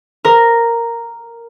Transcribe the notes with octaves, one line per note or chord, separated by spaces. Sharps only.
A#4